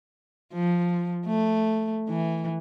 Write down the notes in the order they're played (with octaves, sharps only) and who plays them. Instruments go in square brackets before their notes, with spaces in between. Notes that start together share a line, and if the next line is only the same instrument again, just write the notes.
[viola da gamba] F3
A3
E3